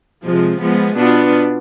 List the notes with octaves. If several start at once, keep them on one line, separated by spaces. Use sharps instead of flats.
C3 F3 G#3
F3 G#3 B3
B2 B3 D4 F4